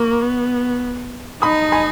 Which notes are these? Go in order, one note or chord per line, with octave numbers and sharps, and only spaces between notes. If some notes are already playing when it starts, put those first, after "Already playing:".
Already playing: A#3 C#6
B3
D#4 B5 D#6
G#5 B5